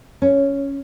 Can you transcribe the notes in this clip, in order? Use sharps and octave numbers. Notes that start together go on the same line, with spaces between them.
C#4